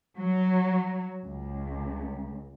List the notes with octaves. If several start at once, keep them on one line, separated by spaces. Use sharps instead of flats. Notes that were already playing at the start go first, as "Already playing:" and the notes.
F#3
C#2